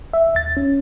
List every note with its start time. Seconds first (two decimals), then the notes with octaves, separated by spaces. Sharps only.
0.13 E5
0.35 D#2 A6
0.57 C#4